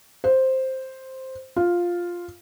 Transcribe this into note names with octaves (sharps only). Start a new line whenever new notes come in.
C5
F4